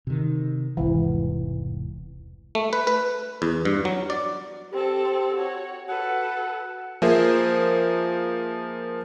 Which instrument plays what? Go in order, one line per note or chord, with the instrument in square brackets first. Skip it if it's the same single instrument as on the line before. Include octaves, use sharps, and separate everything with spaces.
[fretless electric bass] C3 D#3
[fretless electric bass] E1 C2 G#2 [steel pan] E3
[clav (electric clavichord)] A3
B4
B4
E2
G2
F#3
D5
[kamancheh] C4 A4 [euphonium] G4
[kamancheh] F#4 C#5
[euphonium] F#4 [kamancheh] A4 B4 [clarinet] F#5
[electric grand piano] F3 A#3 G#4 A#4 C5 E5